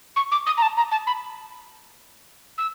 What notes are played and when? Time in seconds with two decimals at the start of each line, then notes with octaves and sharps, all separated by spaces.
0.16 C#6
0.32 D6
0.46 D#6
0.57 A#5
0.62 A5
0.77 A#5
0.91 A5
1.07 B5
2.58 E6